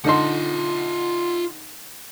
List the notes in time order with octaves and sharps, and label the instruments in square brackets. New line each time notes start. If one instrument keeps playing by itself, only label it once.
[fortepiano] D3 D#4 C6 [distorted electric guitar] F4 F#5